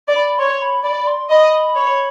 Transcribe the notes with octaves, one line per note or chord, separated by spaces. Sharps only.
D5
B5
C#5 C6
B5
D5 B5
C6
D#5 B5
C#5